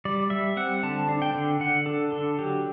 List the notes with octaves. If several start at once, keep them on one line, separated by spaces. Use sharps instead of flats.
G3 D5
G3 E5
C4 F#5
D3 A5
D4
G5
D3
D3 F#5
D4 A4
D3 A4
F#3 G4